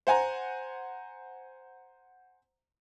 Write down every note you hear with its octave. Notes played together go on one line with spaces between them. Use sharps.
C5 F#5 G#5 A#5